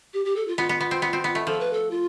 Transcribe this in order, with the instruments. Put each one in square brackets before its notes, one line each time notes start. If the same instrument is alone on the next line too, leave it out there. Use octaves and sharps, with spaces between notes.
[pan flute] G4
G4
A4
F4
[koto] B3 [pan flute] F4
[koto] B3
B3
C4
B3
C4
B3
A3
[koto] F3 [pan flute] A4
[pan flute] B4
A4
F4